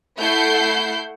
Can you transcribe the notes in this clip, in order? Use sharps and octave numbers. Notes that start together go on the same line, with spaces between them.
A3 E4 F#5 G6 C7